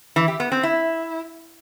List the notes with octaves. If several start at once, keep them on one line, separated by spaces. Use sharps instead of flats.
E3
G4
B3
C4
E4